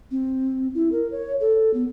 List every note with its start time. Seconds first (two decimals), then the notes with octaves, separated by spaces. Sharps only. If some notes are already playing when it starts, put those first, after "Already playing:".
0.11 C4
0.75 E4
0.92 A#4
1.12 C#5
1.41 A4
1.74 B3